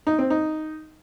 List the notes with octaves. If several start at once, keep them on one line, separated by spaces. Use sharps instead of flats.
D#4
C4
D#4